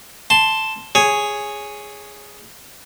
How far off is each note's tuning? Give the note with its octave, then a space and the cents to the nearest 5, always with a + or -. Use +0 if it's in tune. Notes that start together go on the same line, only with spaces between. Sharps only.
A5 +0 C6 +0
G#4 +0 C#5 +0